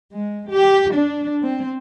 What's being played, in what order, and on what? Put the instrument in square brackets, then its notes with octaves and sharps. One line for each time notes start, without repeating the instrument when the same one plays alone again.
[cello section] G#3
G4
D4
C4